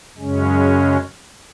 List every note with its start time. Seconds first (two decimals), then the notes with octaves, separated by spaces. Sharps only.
0.17 F#2 C#3 G#3 C#4